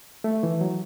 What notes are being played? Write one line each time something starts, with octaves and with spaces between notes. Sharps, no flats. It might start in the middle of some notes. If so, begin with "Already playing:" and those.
A3
E3
F#3